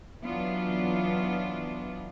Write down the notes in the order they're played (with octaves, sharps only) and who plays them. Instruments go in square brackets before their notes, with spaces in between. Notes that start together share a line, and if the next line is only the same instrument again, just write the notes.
[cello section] E3 F#3 B3 D4 F4